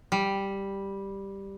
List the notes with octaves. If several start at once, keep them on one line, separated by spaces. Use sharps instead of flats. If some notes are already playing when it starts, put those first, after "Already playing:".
G3